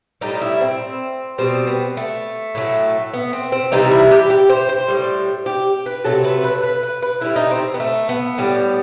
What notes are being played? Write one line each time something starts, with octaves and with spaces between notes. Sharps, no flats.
A2 G3 D#4
E4
C4
B2 G3 C4
B3
A3
A2 F#3 A3
B3
C4
C4
C3 E3 G3 D#4
E4
G4
G4
C5
C5
A2 G3
G4
B4
C3 F#3 A3 A4
B4
B4
B4
B4
B4
A2 G3 E4
D#4
C4
B3
A3
B3
A2 G3